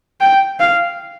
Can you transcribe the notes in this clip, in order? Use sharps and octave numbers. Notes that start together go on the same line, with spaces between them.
G5
F5